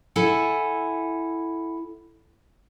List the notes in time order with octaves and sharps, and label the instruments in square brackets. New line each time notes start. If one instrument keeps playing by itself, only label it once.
[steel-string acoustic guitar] E4 A4 F#5 G#5